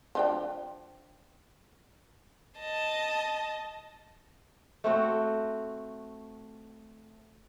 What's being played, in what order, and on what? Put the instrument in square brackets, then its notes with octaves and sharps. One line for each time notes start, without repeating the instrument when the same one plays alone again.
[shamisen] F3 D4 G5
[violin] D#5 A5
[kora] A3 C4 F#4